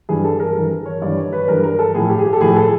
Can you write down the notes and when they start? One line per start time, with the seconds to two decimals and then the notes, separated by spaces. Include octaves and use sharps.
0.09 G2 E3 G#4
0.24 A4
0.40 A#4
0.55 G2 E3 A#4
0.86 C#5
1.01 G2 E3 D5
1.17 C#5
1.32 B4
1.48 G2 E3 A#4
1.64 A#4
1.79 A4
1.94 A2 F3 G#4
2.10 G4
2.19 G#4
2.25 G4
2.33 A4
2.41 A2 F3 G#4
2.56 A4